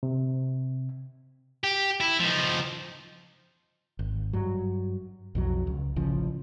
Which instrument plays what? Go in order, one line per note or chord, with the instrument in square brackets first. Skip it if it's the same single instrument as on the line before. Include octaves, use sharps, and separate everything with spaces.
[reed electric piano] C3
[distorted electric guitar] G4
E4
F3 D#4
[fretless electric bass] G#1
G2 F#3
B1 F2 F#3
C#2
A1 C#3 F3